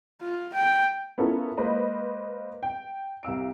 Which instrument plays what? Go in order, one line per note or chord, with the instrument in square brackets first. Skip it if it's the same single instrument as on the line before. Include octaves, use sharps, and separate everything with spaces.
[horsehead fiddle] F4
G5
[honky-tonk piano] B3 C#4 E4 F4 A4 A#4
G#3 A#3 B4 C5 D#5
G5
C2 F5 E6 D7